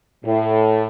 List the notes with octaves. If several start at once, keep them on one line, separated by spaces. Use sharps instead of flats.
A2